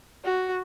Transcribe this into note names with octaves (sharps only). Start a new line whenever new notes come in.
F#4